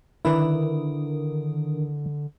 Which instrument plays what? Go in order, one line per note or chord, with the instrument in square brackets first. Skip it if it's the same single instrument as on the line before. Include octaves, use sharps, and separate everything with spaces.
[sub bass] D3 [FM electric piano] D#3 D4 A#4 [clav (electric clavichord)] E4 B4 D5